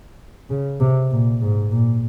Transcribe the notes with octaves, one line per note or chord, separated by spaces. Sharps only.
C#3
C3
A#2
G#2
A#2